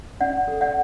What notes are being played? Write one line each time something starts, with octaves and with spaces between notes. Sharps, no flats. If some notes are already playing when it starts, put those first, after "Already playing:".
C#4 D5 F#5
A4
D5 F#5